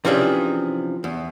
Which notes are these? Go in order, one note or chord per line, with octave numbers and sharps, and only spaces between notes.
C3 E3 F3 C#4 D4 G#4
E2